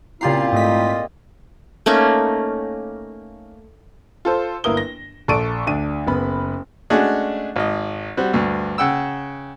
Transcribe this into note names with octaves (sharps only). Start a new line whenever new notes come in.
A#2 C#3 C4 E4 F4 G4 A#5 C7
G#2 A3 D#5 B6
A3 A#3 C#4 D#4
F4 A4 C5
G1 A#3 E4 A#4 D#6 G7
A#6
A#1 A4 D5 C#6 D7 D#7
D2 D4 D#7
F#1 B3 B5
G#3 A3 C#4 D4 F#4 G#4
G#1 D#5
G3 C4 F#4
D2 G2
C#3 F#5 G5 E6